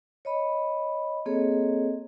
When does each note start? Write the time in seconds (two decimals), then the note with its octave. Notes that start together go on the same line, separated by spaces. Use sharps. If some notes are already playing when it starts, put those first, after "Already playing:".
0.25 C#5 D#5 B5
1.26 A#3 C4 G#4 A4 C#5 D#5